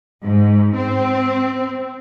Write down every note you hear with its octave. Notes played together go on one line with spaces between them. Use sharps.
G#2
C4